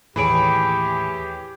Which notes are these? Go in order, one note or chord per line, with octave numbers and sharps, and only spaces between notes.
D#2 A2 E3 G4 G#4 C#5 B5 D7